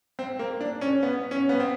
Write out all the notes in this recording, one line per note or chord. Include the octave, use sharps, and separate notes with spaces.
C4
A#3
D4
C#4
B3
C#4
B3
C4